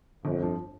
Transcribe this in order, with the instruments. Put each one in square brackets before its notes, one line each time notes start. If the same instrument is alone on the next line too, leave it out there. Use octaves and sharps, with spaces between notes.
[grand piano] G1 [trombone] F2
[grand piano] G2 F3